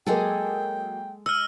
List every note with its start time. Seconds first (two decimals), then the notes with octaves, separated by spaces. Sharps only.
0.07 F#3 G#3 A#3 G#4 A4 G5
1.26 D#5 E6 F6